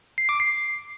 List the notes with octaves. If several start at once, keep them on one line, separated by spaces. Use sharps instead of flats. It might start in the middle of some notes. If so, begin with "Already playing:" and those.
C7
D6
C7